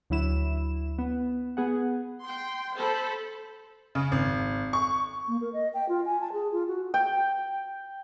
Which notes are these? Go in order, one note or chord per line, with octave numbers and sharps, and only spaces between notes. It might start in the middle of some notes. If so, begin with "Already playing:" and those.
D2 F#3 E4 E7
B3
B3 G#4 F#5
G5 C6
A4 C5 B5
C#3
G#1
C#6
A#3
A#4
D#5
G5
F4
G#5
A5
G#4
F4
F#4
G5